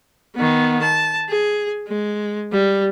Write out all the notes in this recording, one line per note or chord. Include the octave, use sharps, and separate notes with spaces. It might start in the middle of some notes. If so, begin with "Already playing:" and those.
D#3 B3
A5
G#4
G#3
G3